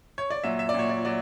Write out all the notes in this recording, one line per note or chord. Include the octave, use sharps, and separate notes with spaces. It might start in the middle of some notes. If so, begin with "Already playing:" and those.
C#5
D5
A#2 F#3 E5
E5
D5
A#2 F#3 C#5
D5
F#3 D5